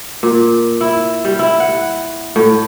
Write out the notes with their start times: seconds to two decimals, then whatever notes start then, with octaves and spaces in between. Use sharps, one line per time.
0.23 A#2
0.81 E4
1.25 G3
1.39 E4
1.60 F#5
2.36 A2